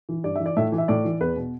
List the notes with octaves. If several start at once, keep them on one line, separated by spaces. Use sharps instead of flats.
E3
G2 D5
E3 E5
D5
A2 E5
E3
E5
A2 D5
E3
E2 B4
B2